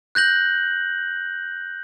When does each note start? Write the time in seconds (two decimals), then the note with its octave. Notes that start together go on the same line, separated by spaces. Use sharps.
0.15 F#6 G6 A#6 F#7